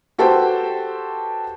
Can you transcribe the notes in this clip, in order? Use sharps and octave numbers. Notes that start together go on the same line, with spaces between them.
F#4 G4 A4 B4 C5 G5